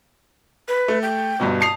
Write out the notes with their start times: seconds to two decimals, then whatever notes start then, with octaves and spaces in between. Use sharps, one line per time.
0.68 B4
0.88 A3
1.02 G5
1.40 G1 G2 B2
1.61 A5 D#6 C7 F7